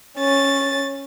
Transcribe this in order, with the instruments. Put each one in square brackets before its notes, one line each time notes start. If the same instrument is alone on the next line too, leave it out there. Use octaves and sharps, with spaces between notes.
[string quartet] C#4 A6